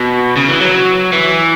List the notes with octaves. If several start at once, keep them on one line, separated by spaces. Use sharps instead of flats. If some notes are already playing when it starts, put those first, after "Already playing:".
Already playing: B2
C#3
E3
F#3
E3